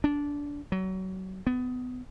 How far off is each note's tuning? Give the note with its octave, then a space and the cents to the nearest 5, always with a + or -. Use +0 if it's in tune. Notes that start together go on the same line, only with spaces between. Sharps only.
D4 -20
F#3 +30
B3 +25